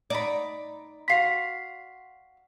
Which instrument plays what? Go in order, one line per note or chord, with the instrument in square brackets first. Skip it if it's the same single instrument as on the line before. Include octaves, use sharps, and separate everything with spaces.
[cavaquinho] D#4 A#5 B5 [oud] D5
[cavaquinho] F#4 F5 C6 [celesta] B6 C7